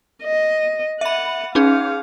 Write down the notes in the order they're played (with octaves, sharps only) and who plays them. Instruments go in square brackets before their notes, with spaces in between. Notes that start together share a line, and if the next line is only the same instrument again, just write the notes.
[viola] D#5
[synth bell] E5 B5 [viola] F#5
[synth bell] C#4 D#4 G#4 [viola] F5